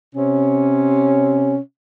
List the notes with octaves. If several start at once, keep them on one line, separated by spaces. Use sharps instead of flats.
C3 C#4